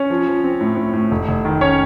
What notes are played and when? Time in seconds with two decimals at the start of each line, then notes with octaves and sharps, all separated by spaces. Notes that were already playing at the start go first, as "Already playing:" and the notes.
Already playing: C#4 C#5
0.10 F3
0.27 F3
0.44 C4
0.61 A2
0.77 A2
0.93 A2
1.11 F1
1.28 F1
1.45 D#3
1.61 C#4 C#5